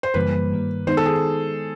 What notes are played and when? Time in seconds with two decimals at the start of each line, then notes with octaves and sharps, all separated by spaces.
0.03 C5
0.14 F#2 C#3 E3 G3 A#3 B4
0.51 G2 D#3 G3 A#3
0.87 D#3 G#3 B3 D#4 C5
0.97 A4
1.06 G#4